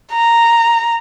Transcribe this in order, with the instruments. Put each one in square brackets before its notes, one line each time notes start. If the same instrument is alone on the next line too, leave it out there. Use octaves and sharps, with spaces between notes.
[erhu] A#5